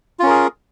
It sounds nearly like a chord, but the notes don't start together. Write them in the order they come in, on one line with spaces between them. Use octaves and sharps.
F4 C#4 A#4 G#4